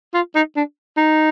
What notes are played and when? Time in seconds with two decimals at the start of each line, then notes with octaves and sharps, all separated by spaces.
0.14 F4
0.35 D#4
0.56 D4
0.97 D#4